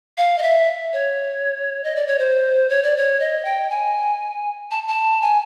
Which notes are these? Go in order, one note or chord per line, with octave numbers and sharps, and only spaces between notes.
F5
D#5
E5
C#5
D#5
D5
C#5
C5
C#5
D5
C#5
D#5
G5
G#5
A5
A5
G#5